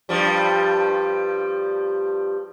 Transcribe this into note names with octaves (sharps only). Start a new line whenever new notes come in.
G2 F3 G3